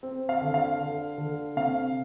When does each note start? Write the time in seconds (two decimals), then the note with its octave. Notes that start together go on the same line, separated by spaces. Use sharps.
0.03 C4
0.29 F5
0.41 D3
0.54 F5
0.80 D3
1.18 D3
1.57 C3 F5